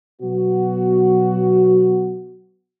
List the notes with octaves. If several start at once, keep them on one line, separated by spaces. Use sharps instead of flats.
B2 F#3 B3 F#4